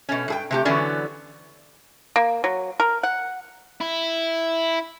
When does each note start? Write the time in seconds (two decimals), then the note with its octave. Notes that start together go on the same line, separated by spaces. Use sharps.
0.09 B2 A3 C#4
0.28 G2 G#4 G5
0.51 C3 A3 G4
0.65 D3 E3 F#3 B3 C#4 D5
2.16 A#3
2.44 F#3
2.80 A#4
3.03 F#5
3.81 E4